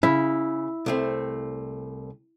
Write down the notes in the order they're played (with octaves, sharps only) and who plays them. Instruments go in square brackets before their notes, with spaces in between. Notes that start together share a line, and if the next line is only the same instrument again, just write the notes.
[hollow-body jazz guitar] C#3 [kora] E4
[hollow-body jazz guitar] C2 A3 C4